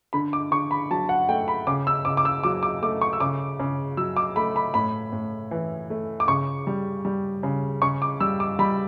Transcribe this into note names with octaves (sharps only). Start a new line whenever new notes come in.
D3 B5
D6
D3 C#6
B5
F#3 A5
F#5
A3 G5
B5
C#3 D6
E6
C#3 D6
D6
E6
F#3 D6
D6
A3 D6
C#6
E6
C#3 D6
C#3
F#3 E6
D6
A3 B5
B5
A2 B5
A2
E3
A3
D6
C#3 C#6
G3
G3
C#3
C#3 C#6
D6
G3 E6
D6
G3 B5